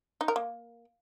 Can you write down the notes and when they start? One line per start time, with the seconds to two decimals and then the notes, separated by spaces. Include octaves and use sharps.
0.21 D#4
0.28 A#4
0.36 A#3